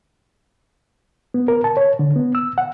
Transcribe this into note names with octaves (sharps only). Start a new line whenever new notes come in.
B3
A#4
A5
C#5
D3
B3
E6
F#5